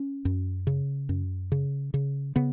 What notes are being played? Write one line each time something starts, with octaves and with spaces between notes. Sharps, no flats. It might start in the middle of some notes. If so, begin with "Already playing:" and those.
Already playing: C#4
F#2
C#3
F#2
C#3
C#3
C#3 B3